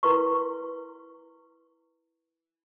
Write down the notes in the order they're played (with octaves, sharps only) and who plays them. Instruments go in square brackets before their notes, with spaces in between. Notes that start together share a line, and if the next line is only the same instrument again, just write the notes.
[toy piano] E4 A#4 B4 C6 C#6